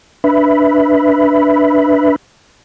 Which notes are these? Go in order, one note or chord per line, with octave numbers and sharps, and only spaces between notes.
D4 B4 E5 B5